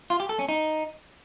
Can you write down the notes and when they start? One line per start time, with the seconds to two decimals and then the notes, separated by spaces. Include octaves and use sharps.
0.10 F4
0.20 G4
0.29 A4
0.39 C#4
0.49 D#4